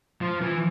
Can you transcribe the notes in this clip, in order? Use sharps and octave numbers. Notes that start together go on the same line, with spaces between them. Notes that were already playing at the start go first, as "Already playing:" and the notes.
F3
E3